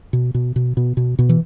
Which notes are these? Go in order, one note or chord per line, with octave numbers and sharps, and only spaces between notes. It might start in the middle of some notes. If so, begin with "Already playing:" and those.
B2
B2
B2
B2
B2
B2
E3